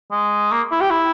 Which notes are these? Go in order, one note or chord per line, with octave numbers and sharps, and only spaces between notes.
G#3
A#3
E4
G4
E4